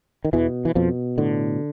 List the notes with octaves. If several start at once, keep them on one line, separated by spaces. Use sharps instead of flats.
D#3
E2 B2 E3
E3
F2 B2 F3
A2 D3